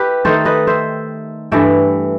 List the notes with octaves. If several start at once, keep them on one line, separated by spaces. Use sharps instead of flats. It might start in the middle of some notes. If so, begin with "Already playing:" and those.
Already playing: E4 G4 B4
D#3 A3 D#4 A4 C5
B4 D#5
C5 E5
G2 E3 A3 E5 G5